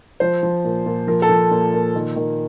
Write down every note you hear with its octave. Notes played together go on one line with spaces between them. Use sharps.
F3 C5
F3
A#2
A#2
F3 A#4
A4
F3
A#2
A#2
D#3
D#3